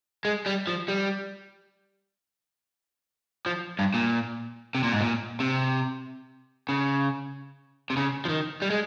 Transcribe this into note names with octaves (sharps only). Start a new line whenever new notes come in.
G#3
G3
F3
G3
F3
G2
A#2
C3
A#2
G#2
A#2
C3
C#3
C3
C#3
F3
D#3
G3
G#3